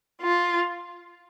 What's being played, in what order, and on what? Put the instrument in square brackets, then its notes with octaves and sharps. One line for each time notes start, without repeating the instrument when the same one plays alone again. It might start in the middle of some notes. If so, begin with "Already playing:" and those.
[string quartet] F4